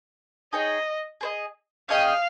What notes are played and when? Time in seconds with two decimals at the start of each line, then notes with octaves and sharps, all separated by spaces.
0.53 D#4 G#4 C#5 D#5 G5
1.21 G#4 C5 D#5
1.89 C#4 G#4 D#5 F5 G5